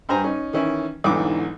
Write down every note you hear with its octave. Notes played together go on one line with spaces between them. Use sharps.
G2 C5 G#5 A#5
C#4 D#4
D#3 E3 C#4 E4
B1 E2 G#2 D3 E3 D6